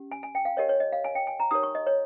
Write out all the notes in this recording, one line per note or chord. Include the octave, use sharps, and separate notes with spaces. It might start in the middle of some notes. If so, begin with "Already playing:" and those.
Already playing: C#4 G4
G#5
G#5
G5
F5
G4 A#4 C#5 D#5
C#5
D#5
F5
G#5
G5
G#5
A#5
D#4 G4 A#4 C#5 D#6
C#6
D#5
C#5